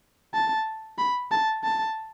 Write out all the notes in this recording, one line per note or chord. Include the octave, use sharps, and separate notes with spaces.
A5
B5
A5
A5